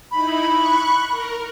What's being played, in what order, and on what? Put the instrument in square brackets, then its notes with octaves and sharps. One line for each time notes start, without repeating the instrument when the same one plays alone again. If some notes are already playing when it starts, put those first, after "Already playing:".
[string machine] D#4 E4 [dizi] B5
[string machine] C#6 F#6
A#4